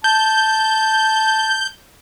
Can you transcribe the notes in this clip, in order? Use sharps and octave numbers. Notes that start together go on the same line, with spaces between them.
A5 G6